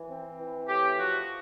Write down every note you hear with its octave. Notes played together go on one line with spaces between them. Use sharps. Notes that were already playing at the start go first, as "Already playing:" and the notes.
Already playing: E3
C4
E3
A2 G4
F3 F#4